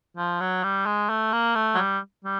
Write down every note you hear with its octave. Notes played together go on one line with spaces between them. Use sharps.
F3
F#3
G3
G#3
A3
A#3
A3
F#3
G3
G3